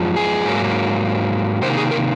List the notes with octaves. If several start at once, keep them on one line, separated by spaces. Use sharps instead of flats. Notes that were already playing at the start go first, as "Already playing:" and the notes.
Already playing: F#2 F3 G#3
G#4
G#2 F#3 A#3
C3 D#3 A#3 C5
G#4
A#4